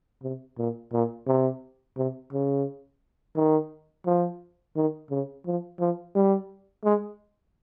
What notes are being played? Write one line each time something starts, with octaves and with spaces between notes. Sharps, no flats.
C3
A#2
A#2
C3
C3
C#3
D#3
F3
D#3
C#3
F3
F3
G3
G#3